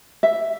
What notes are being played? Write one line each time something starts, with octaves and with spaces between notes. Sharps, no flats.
E5